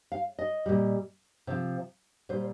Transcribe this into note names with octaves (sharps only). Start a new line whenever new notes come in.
F5
D#5
A#2 G3
C3 F3
A#2 G3 C5